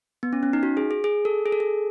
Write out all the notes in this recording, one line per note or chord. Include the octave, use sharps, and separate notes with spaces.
B3
C#4
C#4
D#4
F#4
G#4
G#4
G#4
A4
G#4
A4
G#4